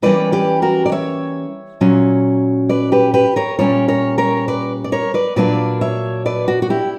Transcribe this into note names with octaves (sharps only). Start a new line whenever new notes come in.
E3 G3 A#3 C#4 B4 D5
G4 B4
F#4 A#4
D5
C#5 E5
A#2 F#3 C#4
B4 D5
G4 B4
G4 B4
A#4 C#5
A#2 G3 C#4 A#4 C#5
A#4 C#5
A#4 C#5
B4 D5
D5
A#4 C#5
B4 D5
A#2 F#3 A#3 D4 B4 D5
C#5 E5
B4 D5
F#4
F#4
E4 G4